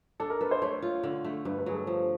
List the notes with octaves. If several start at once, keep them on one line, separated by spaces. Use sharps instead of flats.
D4 A4
A#4
A4 B4
C5
A3 C#5
F4
D3
A3
G2 B4
B4
F#3 G#4
A4
F3